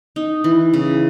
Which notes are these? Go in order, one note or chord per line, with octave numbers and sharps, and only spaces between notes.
D#4
E3
C#3